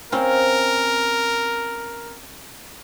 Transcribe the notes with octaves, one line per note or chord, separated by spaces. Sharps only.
C4 C#4 F4 A#4